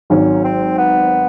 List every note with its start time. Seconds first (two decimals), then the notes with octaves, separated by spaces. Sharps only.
0.10 G#1 G#2 D#3 F#3 C#4
0.44 C4
0.78 B3